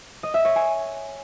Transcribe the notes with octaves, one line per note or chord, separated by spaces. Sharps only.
D#5
E5
C#5
G#5